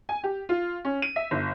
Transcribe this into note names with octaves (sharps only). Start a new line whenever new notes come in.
G#5
G4
F4
C#4
D#7
E5
G1